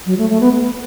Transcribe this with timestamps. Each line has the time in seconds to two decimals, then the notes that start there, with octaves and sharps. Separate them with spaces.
0.06 F#3
0.18 A3
0.30 A3
0.40 B3